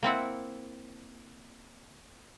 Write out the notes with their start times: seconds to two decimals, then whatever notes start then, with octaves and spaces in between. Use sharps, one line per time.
0.03 A#3 C4 E4 F#5